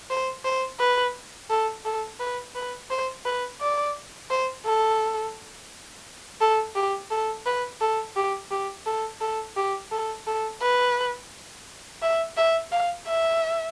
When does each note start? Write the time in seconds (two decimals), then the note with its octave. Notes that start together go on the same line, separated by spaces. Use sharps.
0.10 C5
0.45 C5
0.80 B4
1.50 A4
1.85 A4
2.20 B4
2.55 B4
2.90 C5
3.25 B4
3.61 D5
4.30 C5
4.65 A4
6.41 A4
6.76 G4
7.11 A4
7.46 B4
7.81 A4
8.16 G4
8.51 G4
8.86 A4
9.21 A4
9.56 G4
9.92 A4
10.27 A4
10.62 B4
12.02 E5
12.37 E5
12.72 F5
13.07 E5